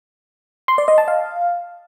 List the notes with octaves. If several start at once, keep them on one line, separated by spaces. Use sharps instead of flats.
C6
D5
D#5
A5
F5